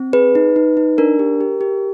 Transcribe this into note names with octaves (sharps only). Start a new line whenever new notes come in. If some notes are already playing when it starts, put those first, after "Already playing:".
Already playing: C4
G#4 B4
D#4
D#4
D#4
D4 A#4
G4
G4
G4